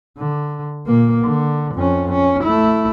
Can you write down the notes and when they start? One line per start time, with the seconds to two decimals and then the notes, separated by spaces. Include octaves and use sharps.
0.18 D3
0.87 A#2 A#3
1.25 D3
1.75 F2 C#4
2.12 C#4
2.44 A3 E4